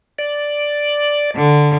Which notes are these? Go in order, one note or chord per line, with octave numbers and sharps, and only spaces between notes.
D5
D3